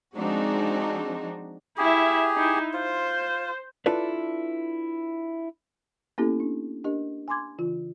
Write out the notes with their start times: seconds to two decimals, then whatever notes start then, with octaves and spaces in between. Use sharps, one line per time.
0.15 F3 G#3 C4 D4 D#4 F#4
1.78 E4 G4 G#4 E5
2.35 D#4 E4
2.74 F4 C5
3.86 D4 E4 F4 A4 B4 D5
6.18 A#3 B3 C#4 E4 G4 A4
6.40 D4
6.84 D4 G4 A#4 D#5
7.28 G#5 B5 C6 D6 G#6
7.58 C#3 E3 F4